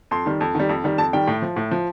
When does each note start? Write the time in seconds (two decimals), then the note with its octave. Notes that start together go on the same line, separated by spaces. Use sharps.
0.11 F2 C6
0.26 D#3 G3
0.41 F2
0.55 D#3 G3
0.69 F2
0.84 D#3 G3
0.98 F2 A5
1.13 D#3 G3 G5
1.27 A2
1.42 F3
1.56 A2
1.71 F3